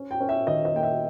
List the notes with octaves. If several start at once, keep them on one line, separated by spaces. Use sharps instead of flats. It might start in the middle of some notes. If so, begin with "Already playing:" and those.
Already playing: C#4
G5
C#4
E5
D#3 D#5
D#5
A#3 G5
E5